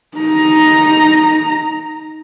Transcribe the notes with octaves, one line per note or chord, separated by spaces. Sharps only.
D#4 A#5